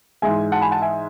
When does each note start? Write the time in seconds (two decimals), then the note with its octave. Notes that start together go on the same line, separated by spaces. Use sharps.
0.22 G#2 E3 G#3 E5 G#5
0.52 F#5 A5
0.62 G#5 B5
0.71 F#5 A5
0.82 E5 G#5